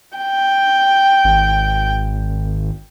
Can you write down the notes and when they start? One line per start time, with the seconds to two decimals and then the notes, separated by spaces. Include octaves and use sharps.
0.17 G5
1.24 G#1